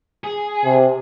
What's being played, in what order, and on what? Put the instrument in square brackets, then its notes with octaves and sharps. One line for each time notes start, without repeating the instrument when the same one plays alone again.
[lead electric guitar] G#4
[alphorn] C3